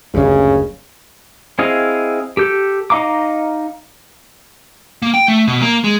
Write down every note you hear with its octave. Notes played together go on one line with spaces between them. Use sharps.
F#1 D2 G2 C#3
C4 E4 G#4 D#5 F5
G4 A4 G6
D#4 D#5 F5 A#5 D6
A#3
G5
A3
B2
A#3
G#3